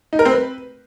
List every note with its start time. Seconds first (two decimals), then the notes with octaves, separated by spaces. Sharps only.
0.13 D#4
0.19 A#4
0.25 C4
0.32 B4